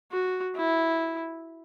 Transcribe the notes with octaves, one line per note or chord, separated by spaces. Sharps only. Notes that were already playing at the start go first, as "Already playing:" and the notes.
F#4
E4